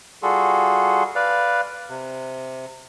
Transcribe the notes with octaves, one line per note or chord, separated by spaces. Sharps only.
G3 F4 F#4 G#4 A4
B4 D5 F5
C3